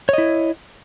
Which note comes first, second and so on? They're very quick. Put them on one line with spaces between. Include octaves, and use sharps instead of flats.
C#5 D#5 E4